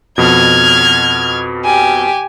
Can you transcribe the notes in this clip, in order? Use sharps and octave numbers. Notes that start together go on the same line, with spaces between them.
F2 B2 F6 G#6
G4 G#5